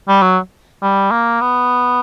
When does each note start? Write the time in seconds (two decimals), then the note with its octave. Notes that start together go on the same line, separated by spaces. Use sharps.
0.08 G3
0.22 F#3
0.82 G3
1.11 A#3
1.41 B3